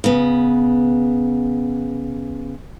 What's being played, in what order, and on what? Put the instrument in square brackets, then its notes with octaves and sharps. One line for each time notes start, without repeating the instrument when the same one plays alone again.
[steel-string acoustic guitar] C#3 B3